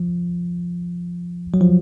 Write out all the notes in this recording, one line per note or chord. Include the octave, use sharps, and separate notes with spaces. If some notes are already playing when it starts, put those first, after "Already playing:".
Already playing: F3
F#3
F3